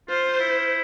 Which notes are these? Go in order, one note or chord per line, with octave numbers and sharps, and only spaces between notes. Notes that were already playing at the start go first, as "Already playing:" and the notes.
F4 C5
E4